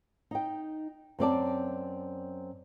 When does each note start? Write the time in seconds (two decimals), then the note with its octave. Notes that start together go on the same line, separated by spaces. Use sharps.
0.31 D#4 G5
1.19 F#2 C4 D5 A5